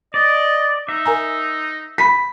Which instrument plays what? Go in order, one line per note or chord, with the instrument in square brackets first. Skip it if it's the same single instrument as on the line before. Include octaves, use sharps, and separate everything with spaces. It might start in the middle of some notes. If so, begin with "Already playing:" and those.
[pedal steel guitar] D5 [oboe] D#5
[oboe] D#4 [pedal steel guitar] E5
[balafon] A#4 G#5 A#5
[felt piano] B5 B6